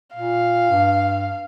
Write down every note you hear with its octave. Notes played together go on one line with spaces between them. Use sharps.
A#2 F5
G2